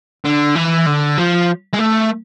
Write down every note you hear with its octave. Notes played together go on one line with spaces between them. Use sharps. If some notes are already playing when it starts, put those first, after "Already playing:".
D3
E3
D3
F3
G#3
A3